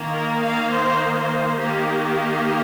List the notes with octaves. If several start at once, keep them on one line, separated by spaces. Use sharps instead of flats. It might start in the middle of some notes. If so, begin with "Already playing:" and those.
Already playing: D#3 A#3
A#4
F5
C5
C5
D#3 A#3 G4